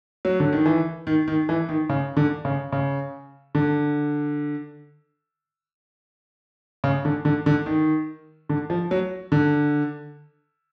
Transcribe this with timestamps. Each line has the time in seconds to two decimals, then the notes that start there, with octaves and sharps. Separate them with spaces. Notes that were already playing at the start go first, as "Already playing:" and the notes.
0.25 F#3
0.40 D3
0.53 D#3
0.66 E3
1.07 D#3
1.28 D#3
1.49 E3
1.69 D#3
1.89 C#3
2.17 D3
2.45 C#3
2.72 C#3
3.55 D3
6.84 C#3
7.05 D3
7.25 D3
7.46 D3
7.66 D#3
8.49 D3
8.70 F3
8.91 F#3
9.32 D3